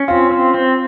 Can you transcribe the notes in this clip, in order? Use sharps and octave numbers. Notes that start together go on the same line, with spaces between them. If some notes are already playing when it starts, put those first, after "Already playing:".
Already playing: C#4
C4 F4
C4
C4